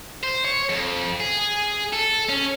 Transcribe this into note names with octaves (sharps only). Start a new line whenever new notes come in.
C5
C#5
F2
G#4
A4
C#4